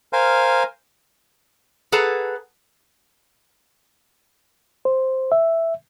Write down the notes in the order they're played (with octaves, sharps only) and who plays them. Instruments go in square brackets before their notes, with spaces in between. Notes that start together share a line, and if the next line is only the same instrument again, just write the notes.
[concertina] A#4 C5 F5 G#5
[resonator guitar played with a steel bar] G#4 A4 B4 F#5 A5 A#5
[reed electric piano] C5
E5